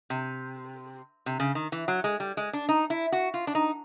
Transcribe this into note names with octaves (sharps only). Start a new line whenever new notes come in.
C3
C3
C#3
D#3
E3
F#3
G#3
G3
G#3
D4
D#4
E4
F#4
F4
D4
D#4